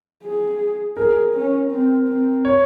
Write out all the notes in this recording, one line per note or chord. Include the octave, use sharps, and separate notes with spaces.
G#4
G#4 A#4
C#4
C4
C4
C#5